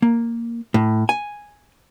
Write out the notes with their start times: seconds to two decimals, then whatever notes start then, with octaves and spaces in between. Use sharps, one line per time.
0.02 A#3
0.74 A2
1.09 G#5